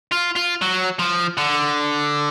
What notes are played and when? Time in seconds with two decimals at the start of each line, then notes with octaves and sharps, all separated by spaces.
0.11 F4
0.36 F4
0.61 F#3
0.99 F3
1.37 D3